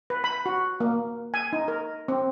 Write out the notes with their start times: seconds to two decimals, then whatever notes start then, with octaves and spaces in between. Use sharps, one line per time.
0.10 B4
0.24 B5
0.46 F#4
0.80 A#3
1.34 G#5
1.53 D#4
1.68 A#4
2.08 C4